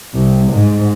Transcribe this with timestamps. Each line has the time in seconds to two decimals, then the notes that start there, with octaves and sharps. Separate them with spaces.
0.15 C2
0.52 G#2